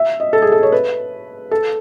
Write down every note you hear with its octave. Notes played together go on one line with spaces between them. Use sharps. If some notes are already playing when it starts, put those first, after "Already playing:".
Already playing: E5
D#5
A4
G#4
A4
C#5
B4
A4